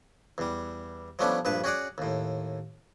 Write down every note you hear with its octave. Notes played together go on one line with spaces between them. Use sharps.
E2 G3
F3 G3 A3 B3 C#4 D4
A#1 G2 B4 A5
C#4 F#4 G#4 D5 F#5
D#2 A2